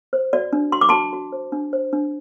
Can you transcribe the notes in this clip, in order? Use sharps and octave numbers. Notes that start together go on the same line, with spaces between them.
C5
F#4 D5
D4
F#4 C6
D6
F#4 A5 C6
F#4
C5
D4
C5
D4